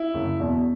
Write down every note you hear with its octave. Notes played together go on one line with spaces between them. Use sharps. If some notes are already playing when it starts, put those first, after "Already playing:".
Already playing: E4
F#1
E2 B2